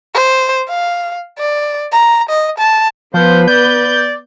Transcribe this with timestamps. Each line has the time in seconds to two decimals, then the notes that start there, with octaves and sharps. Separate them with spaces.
0.15 C5
0.69 F5
1.39 D5
1.92 A#5
2.30 D#5
2.59 A5
3.14 F3 B3 B4 C5
3.48 D5 G6